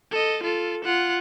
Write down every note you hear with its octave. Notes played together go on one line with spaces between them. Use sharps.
A4 D#5
F4 A4
F4 F#5